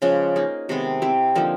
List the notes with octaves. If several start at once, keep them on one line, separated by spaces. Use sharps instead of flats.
C#3 F3 G#3 C#4
A#3 D#4 G#4
C3 D#3 G#3 B3
C4 E4 G4
D3 F3 A#3 D#4